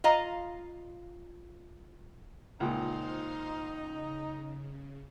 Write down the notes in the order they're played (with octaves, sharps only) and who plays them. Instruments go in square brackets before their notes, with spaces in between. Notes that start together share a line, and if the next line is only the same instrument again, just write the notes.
[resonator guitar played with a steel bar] F4 D#5 F5 A#5
[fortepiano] C#2 A#2 [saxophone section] D#4 [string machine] C5 F5 C6
[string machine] C#3